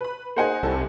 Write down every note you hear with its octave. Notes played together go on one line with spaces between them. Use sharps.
B4 B5
A#3 D#4 G#4 C5 F#5 G#5
C2 G3 A4